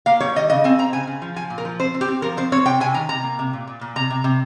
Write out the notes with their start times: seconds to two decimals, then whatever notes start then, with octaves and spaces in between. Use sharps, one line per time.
0.06 A#3 F5
0.20 G3 C#5
0.36 D#3 D#5
0.50 C#3 D#5
0.64 C4 G#5
0.79 C4 A#5
0.93 C#3 G#5
1.07 C#3
1.22 F3
1.36 F3 G#5
1.50 A#2
1.58 A#4
1.65 F3
1.79 C4 C5
1.94 C4
2.01 G4
2.08 C4
2.22 F3 A#4
2.37 C4 C5
2.52 C4 C#5
2.65 C3 G5
2.80 C3 G#5
2.94 D#3 A#5
3.09 C3 A#5
3.23 A#3
3.39 C3
3.53 A#2
3.67 A#2
3.81 A#2
3.96 C3 A#5
4.10 C3
4.24 C3